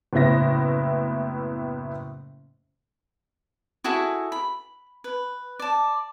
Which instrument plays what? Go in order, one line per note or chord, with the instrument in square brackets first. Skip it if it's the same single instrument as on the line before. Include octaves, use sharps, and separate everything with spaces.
[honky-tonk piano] F#1 A2 B3 E4 A#6
[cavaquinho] E4 F#4 G#4 A4
B5
B4
D5 A5